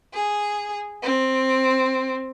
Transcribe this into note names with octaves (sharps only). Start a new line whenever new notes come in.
G#4
C4